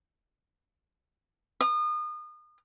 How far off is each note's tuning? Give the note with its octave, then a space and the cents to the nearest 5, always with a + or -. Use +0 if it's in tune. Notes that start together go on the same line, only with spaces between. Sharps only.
D#6 -35